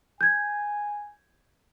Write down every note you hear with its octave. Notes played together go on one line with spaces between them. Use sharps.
G#5 G6 G#6